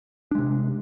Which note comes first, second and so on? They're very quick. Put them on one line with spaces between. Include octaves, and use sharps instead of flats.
D4 G#3 C3